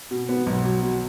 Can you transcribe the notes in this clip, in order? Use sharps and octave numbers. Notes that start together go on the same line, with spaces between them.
B2
B3
B1
F#3
B2